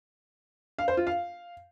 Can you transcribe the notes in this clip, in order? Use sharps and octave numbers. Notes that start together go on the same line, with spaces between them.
F5
C5
F4
F5